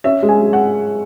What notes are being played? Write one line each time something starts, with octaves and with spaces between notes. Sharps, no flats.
C#4 E5
G#3
G#5
G#3
F#5